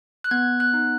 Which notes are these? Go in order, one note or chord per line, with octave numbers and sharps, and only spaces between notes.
F#6
B3 G#6
F#6
D#4